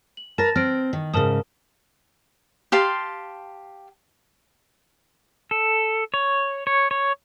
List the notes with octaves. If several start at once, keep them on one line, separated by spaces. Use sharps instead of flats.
F#7
A#4 B4 A5 A6 A#6
C4 F6 A#6 D7
D#3
G#2 C#3 A#4 A5 D#6
G4 F5 A5 C6
A4
C#5
C#5
C#5